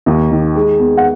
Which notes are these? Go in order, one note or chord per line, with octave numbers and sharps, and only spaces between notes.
D#2
D#3
G#3
B3
F#5